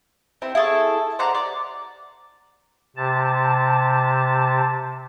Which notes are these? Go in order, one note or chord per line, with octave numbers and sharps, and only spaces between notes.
C4 E4
E4 G#4 A4 C#6
C5 D5 F#5 A#5
D5
C3 A5